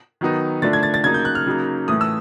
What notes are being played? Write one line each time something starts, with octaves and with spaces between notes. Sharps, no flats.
D#3 F#3 B3 D#4
D3 F3 A3 D4 A6
G#6
A6
A6
C#3 F#3 A#3 D#4 G#6
G6
F#6
F6
C#3 F#3 A#3 D#4
A2 E3 A3 D#6
E6